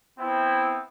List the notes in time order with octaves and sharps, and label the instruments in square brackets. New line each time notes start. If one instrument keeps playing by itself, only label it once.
[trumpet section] B3 C4 E4